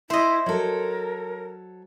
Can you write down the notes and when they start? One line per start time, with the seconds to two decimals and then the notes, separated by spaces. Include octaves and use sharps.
0.10 E4 C5 D#5 E5
0.46 F#3 A4 A#4 C#5